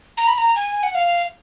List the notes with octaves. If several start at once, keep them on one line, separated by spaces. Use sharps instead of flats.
A#5
B5
A#5
G#5
F#5
F5